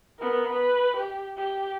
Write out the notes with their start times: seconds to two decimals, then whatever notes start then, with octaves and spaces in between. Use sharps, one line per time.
0.19 B3 A#4
0.50 B4
0.97 G4
1.38 G4